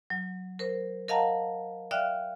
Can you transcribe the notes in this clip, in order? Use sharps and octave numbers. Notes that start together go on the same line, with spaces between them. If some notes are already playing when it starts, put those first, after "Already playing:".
F#3
A#4 C5
A#4 D#5 F5 F#5 A5 A#5
D5 E5 F5 G5 F6 F#6